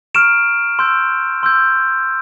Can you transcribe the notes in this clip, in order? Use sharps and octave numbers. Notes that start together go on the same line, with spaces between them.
A#5 C#6 F6 D7 E7
C6 E6 G6
C6 E6 G6